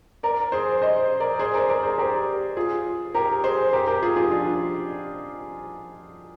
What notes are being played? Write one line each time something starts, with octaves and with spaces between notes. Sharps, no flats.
A#4 D5
G#4 C5
C5 D#5
A#4 D5
G#4 C5
A#4 D5
A#4 D5
G#4 C5
G4 A#4
F4 G#4
G4 A#4
G#4 C5
G4 A#4
G4 A#4
F4 G#4
F4 G#4
D4 F4